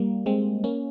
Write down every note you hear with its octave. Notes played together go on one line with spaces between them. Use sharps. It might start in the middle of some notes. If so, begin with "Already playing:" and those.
Already playing: G3 A#3
G#3 C4
A#3 C#4